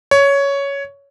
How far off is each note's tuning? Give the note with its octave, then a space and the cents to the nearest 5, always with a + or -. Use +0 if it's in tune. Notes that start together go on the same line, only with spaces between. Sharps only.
C#5 +10